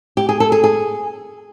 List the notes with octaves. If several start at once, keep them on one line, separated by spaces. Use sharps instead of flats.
G4
G#4
A4
G#4
G#4